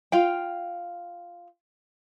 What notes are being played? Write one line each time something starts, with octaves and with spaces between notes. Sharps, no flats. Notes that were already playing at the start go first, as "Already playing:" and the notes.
F4 F5 G5